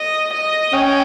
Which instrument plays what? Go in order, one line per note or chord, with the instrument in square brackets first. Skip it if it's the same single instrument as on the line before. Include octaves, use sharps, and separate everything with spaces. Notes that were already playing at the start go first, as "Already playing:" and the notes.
Already playing: [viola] D#5
D#5
[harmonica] C#4 [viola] G5